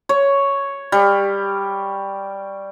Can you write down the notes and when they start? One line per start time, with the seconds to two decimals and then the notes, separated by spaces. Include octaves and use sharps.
0.09 C#5
0.92 G3